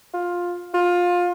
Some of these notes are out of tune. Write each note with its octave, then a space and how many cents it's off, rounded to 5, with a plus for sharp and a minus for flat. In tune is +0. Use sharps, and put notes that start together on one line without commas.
F4 +10
F4 +20